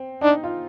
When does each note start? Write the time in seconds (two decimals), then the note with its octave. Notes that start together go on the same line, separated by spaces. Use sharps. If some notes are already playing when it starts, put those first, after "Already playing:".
Already playing: C4
0.21 D4 D#4
0.44 F4